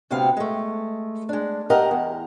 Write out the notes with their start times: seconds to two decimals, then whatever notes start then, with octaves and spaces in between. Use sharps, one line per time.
0.10 D2 C3 B3 C4 F5
0.37 G#3 A3
1.29 G#3 D4
1.70 G4 A#4 D#5 F5 F#5
1.91 E2